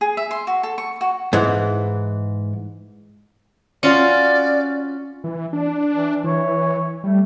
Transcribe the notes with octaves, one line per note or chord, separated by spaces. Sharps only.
G#4
E5
C6
F#4
A4
C#6
F#4
G#2 E3
C#4 F4 F#4 D5
E3
D4
E3
E3 C#5
G3 A3